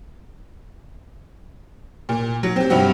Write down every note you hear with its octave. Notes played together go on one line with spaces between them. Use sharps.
A#2
F#3
C4 G4
G2 C3 C4 F#4